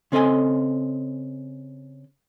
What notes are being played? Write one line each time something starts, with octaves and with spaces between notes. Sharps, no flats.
C#3 C4 A4 D#5 G#5